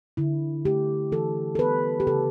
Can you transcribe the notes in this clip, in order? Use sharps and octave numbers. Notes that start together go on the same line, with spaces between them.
D3 E4
A3 G4
E3 A4
A4
G3 B3 B4
G4
C#3 A4